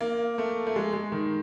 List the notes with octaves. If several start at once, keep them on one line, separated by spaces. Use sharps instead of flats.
A#3
A3
A3
G#3
G#3
D#3